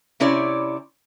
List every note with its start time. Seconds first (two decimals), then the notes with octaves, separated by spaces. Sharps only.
0.20 C3 C#4 E4 C#5 D5